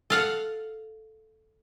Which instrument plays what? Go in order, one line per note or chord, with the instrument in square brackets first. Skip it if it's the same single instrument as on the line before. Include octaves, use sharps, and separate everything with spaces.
[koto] A4 F5 F#5